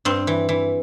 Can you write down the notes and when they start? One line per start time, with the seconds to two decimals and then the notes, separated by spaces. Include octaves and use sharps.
0.05 G2 C4
0.27 E3
0.49 E3